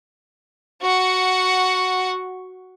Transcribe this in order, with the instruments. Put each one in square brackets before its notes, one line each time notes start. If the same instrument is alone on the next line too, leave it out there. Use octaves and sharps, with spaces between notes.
[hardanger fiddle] F#4 F#5